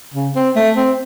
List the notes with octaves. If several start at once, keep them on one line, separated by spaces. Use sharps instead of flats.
C#3
C4
A3
C4